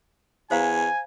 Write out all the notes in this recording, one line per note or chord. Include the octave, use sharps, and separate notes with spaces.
E2 C5 F5 G#5 A#5